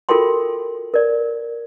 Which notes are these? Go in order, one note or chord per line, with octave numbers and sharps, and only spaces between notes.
F4 F#4 A4 A#4 G5 C6
A#4 D5